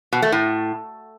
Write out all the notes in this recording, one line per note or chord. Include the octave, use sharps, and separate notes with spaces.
B2
A3
A2